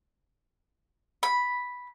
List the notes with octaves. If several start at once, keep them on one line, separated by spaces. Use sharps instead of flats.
B5